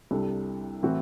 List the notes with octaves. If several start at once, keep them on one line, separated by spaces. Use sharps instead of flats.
C2 C3 G3 D4 A4
A2 E3 A3 C4 F#4